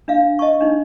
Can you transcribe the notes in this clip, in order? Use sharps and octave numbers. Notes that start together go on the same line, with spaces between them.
D4 E5 F5
D#5 A5 C#6
D4 D#4